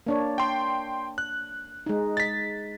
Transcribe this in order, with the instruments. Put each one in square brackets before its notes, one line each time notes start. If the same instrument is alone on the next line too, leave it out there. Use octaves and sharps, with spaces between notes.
[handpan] A#3 D4 C#5
[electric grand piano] G5 C6
F#6
[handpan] G#3 D#4
[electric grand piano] A6 B6